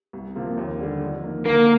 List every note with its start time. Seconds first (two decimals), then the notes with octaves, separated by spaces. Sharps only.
0.13 C2
0.35 C3 F3 A#3 F4
0.57 D#2
0.79 D3 G3 D4
1.01 F2
1.23 D#3 A#3
1.45 D3 A#3